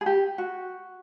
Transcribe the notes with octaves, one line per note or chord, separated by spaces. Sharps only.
G#4
G4
F#4